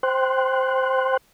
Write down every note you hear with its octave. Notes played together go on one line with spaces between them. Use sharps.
C5 G5 C6 F#6